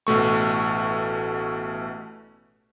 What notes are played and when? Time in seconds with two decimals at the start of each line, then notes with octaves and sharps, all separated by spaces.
0.07 A1 B2 A3 C#6